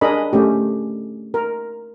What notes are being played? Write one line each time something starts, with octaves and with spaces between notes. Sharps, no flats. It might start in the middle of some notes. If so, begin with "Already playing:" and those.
D4 G#4 A#4 D#5 B5
A3 C#4 G4
A#4